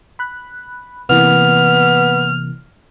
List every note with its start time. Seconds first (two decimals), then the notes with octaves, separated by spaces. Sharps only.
0.19 B5 F#6
1.09 C3 E3 A#3 B3 F6